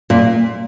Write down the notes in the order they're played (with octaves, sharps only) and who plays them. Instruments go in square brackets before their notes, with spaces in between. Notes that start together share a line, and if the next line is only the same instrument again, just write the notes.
[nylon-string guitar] A#2